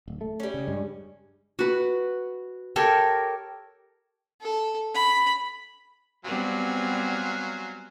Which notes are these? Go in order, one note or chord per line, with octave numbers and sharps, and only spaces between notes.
D1
A3
G3 C#4
C#3
G2 G#3
F#4 B4
G4 A4 A#4 C#5
A4
B5
F#3 G3 B3 C4 F4 G#5